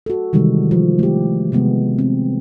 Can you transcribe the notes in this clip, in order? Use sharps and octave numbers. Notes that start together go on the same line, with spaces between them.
F#4 A4
C3 D#3 E3 G3 G#3
F3
A3 G4
C3 G#3 B3
C4